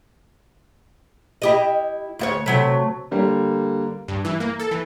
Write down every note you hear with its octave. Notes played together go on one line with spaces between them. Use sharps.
E4 G4 D#5
D2 F4 C#5
C3 F#3 A3
D3 G3 A#3
G2
E3
A#3
A4
E3